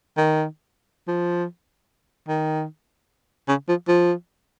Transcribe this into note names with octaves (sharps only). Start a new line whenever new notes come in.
D#3
F3
D#3
C#3
F3
F3